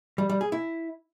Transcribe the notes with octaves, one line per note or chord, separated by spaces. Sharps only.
G3
G3
G#4
E4